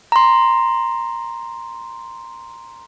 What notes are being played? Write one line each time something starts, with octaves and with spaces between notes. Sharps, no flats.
A#5 C6